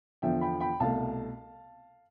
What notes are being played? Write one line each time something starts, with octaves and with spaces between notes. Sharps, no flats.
E2 D3 F3 E5 G5
G5 B5
G5 B5
C2 B2 A3 F5 A5